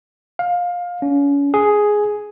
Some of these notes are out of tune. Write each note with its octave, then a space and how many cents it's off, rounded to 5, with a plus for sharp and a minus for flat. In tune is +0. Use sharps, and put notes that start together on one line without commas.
F5 +20
C#4 +35
G#4 +5